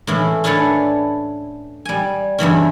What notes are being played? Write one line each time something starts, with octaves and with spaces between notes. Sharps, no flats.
A2 E3 C#4
C#4 D4 E4 A4 B4 C#5
G3 G#5
E2 G2 E3 C#4